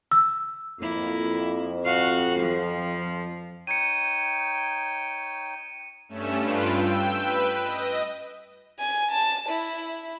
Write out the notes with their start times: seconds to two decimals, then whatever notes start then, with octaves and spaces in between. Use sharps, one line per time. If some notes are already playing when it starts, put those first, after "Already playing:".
0.11 E6
0.80 F2 A#3 E4
1.85 F#4 F5
2.40 F3
3.67 D#4 C#5 G5 C#7 D#7
6.09 G2 A3 C#4 E7
6.39 G2 F4 B4 D7
6.72 G5 E6
7.16 B4
7.63 D#5
8.79 G#5
9.11 A5
9.49 E4